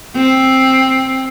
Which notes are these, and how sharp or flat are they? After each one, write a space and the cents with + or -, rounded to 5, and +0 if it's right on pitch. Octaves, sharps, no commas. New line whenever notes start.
C4 +10